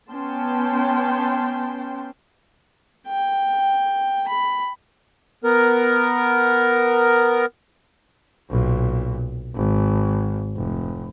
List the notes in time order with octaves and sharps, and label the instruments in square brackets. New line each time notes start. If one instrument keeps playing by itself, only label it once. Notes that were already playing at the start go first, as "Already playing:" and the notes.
[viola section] B3 C#4 G5 A5 C6
[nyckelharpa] G5
B5
[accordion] B3 A#4
[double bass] B1 A#2
G#1
F1